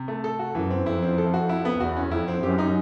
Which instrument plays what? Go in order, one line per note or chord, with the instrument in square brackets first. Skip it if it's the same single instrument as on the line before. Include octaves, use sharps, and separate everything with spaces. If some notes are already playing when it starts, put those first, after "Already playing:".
Already playing: [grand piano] C3
A3
A4
F#4
[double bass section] F#2 [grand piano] E3
[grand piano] C4
[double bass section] F2 [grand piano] E4
[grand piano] C4
A4
F#4
E4
B3
[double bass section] E2 [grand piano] F#4
[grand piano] C#4
[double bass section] F2 [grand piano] E4
[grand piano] C4
[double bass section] F#2 [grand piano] G4
[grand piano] D#4